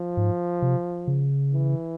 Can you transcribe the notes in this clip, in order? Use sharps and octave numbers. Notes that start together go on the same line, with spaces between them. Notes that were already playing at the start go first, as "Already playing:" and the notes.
Already playing: F3
G#2
C3
C#3
E3